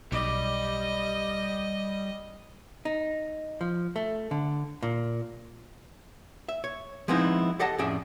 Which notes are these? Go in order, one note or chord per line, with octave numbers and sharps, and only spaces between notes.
B1 G3 D5 D#5
D#4
F3
A3
D3
A#2
E5
C#5
F3 G#3 B3 C4 D#4 E4
G4 A4 D#5 F#5 A5
F2 A2 C#4 G#4 D5 E5